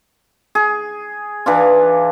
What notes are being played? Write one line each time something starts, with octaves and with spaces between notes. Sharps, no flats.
G#4
E3 D4 F4